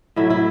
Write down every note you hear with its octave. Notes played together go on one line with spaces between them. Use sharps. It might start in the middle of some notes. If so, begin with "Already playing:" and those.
A2 F#3 E4
E4